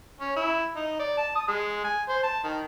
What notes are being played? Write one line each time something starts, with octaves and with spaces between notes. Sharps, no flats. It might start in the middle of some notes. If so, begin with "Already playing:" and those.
C#4
E4
D#4
D5
A5
D#6
G#3
G#5
C5
A5
D#3